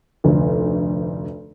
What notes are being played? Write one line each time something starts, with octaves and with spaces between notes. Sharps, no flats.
F1 D2